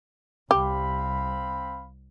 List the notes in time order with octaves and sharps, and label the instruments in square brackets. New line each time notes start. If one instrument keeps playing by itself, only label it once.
[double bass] C2 [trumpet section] C4 F5 B5 [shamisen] G4